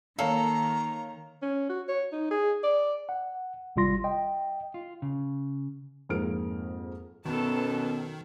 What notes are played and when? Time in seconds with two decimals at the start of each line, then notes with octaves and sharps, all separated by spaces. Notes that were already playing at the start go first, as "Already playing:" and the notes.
0.19 D#3 A#3 A4 C#5 F5 A#5
1.42 C#4
1.69 F#4
1.88 C#5
2.12 D#4
2.31 G#4
2.64 D5
3.09 F#5
3.76 G#1 C3 G3 F4 C6 A#6
4.04 D#5 G5
4.74 F4
5.02 C#3
6.09 F2 G#2 A#3 A#4 F6 D7
7.25 F#2 B2 D#3 B3 A4 A5